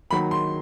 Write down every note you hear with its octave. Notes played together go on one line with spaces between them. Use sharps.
D#3 F#3 A#3 B5
C6